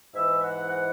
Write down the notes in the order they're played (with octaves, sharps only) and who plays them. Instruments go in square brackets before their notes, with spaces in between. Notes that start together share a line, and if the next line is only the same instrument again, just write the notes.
[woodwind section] G#2 E3 E5
F#5
F#5